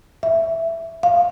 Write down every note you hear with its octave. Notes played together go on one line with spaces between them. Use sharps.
E5
F5